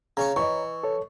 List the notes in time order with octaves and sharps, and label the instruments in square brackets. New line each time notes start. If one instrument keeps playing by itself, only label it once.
[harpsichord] C#3 C#4 C#6 [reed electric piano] C#5 A#5
[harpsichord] E3 [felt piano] D#5 C#6
[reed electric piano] A4 C#5